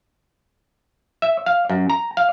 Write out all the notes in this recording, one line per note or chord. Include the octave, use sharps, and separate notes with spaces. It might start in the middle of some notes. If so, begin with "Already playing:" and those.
E5
F5
F#2
A#5
F5